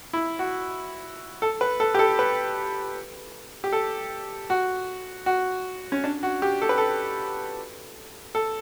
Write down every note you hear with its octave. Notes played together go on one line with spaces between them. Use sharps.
E4
F#4
A4
B4
A4
G4
A4
B4
G4
A4
F#4
F#4
C#4
D4
F#4
G4
A4
B4
A4
A4